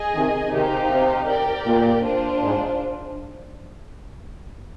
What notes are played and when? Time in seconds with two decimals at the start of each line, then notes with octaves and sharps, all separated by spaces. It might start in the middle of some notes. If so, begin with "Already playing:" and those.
Already playing: G#4 D#5 G#5
0.15 C3 D#3
0.52 C3 D#3 D#4 G4 C5 F5
0.90 C3
1.28 G4 A#4 D5 G5
1.65 A#2
2.03 D4 F4 C5
2.41 G#2